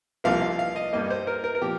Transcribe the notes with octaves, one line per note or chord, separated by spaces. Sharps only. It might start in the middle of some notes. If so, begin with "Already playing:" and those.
C2 C3 F3 A#3 F5
F5
F5
D#5
G2 G3 A#3 D#5
C5
A#4
A#4
A#4
A#2 F3 G4